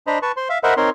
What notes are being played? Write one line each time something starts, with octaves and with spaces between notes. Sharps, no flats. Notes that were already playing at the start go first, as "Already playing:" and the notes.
D4 C5 D#5 A#5 B5
B4 A5 C#6
C5 C6
E5 F5
A#4 C5 D#5 E5 F#5 B5
C4 D#4 A#4 C#5 C6